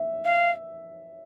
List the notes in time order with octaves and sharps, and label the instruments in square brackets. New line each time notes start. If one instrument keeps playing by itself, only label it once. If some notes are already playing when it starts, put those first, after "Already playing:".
Already playing: [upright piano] E5
[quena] F5